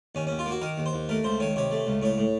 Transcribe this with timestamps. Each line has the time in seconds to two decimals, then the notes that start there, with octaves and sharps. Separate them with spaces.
0.15 D#2 C#4
0.27 D#2 C#4
0.39 F4
0.46 A#3 F#4
0.61 D#3 A#4
0.78 D#2
0.86 C5
0.93 D#2
1.09 A3 A#4
1.24 C#2 C5
1.40 D#3 C#5
1.56 C3 C#5
1.71 A3
1.87 C#2
2.02 A2 C#5
2.18 A2